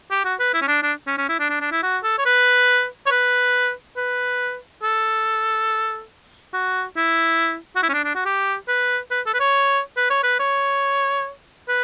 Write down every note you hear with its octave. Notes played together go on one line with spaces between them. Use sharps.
G4
F#4
B4
E4
C#4
D4
D4
C#4
C#4
E4
D4
D4
D4
E4
F#4
A4
C#5
B4
C#5
B4
B4
A4
F#4
E4
F#4
E4
C#4
D4
D4
F#4
G4
B4
B4
A4
B4
C#5
B4
C#5
B4
C#5
B4